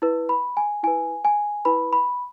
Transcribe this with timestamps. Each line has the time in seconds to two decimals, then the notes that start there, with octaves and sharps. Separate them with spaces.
0.02 E4 B4
0.29 B5
0.57 G#5
0.83 E4 B4 G#5
1.25 G#5
1.65 E4 B4 B5
1.93 B5